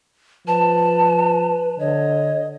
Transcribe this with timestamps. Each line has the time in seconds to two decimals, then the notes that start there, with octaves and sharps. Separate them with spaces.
0.47 F3 B4 A5
1.80 D3 C#5 D#5